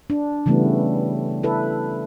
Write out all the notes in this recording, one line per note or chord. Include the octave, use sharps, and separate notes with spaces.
D4
C#3 E3 G3 A3 B3
E4 A4 B4